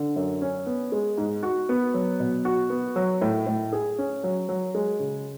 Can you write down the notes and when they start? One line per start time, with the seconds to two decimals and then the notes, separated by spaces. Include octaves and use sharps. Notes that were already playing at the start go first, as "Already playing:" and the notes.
Already playing: D3
0.16 F#2
0.41 C#4
0.66 B3
0.92 G#3
1.18 G#2
1.43 F#4
1.69 B3
1.94 F#3
2.20 B2
2.45 F#4
2.70 B3
2.96 F#3
3.21 A2
3.47 A2
3.73 G#4
3.98 C#4
4.24 F#3
4.49 F#3
4.75 G#3
5.00 C#3